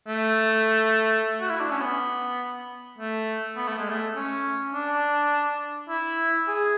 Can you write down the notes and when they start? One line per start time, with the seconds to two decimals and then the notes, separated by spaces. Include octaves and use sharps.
0.07 A3
1.41 F#4
1.50 E4
1.60 D4
1.71 C#4
1.81 B3
2.98 A3
3.56 B3
3.68 A3
3.79 G#3
3.90 A3
4.15 C#4
4.74 D4
5.89 E4
6.48 G#4